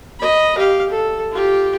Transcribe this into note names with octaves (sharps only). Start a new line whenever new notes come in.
D#5 B5
G4 F5
A4
F4 G4